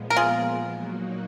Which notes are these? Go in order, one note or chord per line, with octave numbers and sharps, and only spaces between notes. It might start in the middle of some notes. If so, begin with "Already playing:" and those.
Already playing: A#2 F3 G#3 B3
A#4
F4 G#4
A#2 F#3 A#3 D#4 F#4